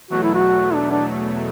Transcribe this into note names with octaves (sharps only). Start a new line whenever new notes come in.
E2 B2 F#3 A3 F#4
E4
F#4
D4
D4